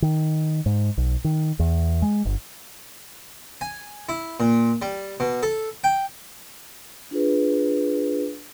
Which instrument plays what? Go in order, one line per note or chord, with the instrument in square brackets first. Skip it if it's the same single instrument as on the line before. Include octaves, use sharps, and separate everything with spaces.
[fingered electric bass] D#3
G#2
B1
D#3
E2
G#3
G1
[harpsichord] G#5
E4
A#2
G3
B2
A4
G5
[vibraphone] D4 F4 G#4 B4